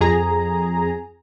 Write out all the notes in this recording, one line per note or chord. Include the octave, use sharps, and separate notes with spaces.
F2 G#4 A#5